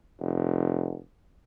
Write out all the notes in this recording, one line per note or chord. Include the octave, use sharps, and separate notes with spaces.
F1